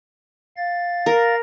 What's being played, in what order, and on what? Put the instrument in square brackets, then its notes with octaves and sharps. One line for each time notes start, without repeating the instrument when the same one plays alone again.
[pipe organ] F5 A6
[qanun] A#4